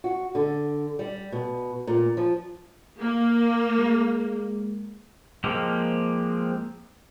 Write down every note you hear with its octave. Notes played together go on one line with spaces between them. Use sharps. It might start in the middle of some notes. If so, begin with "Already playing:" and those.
F#4
D3
G3
B2
A#2
F3
A#3
G#3
F3 G#3 A#3 C4 G4